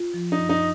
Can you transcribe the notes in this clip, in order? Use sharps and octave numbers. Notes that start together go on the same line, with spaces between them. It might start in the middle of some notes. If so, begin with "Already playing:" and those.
Already playing: F4
F3
D#4
F#2
D#4